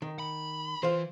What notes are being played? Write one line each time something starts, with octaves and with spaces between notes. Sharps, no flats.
D#3
B5
E3 F4 C5